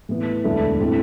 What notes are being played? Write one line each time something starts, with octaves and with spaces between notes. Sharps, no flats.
A2 E3 B3
E1 D2 D3 A3 E4
A2 E3 A3 C4